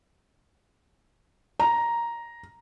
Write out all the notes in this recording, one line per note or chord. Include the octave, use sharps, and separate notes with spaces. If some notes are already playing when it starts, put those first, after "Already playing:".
A#5